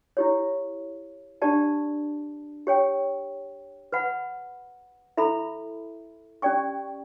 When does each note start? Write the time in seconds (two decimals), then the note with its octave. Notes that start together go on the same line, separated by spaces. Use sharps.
0.17 E4 G4 C#5
1.42 D4 G4 D5 A5
2.67 G4 C#5 G5
3.92 B4 F#5 B5
5.17 E4 A4 E5 B5
6.42 C#4 G4 D5 G5 C#6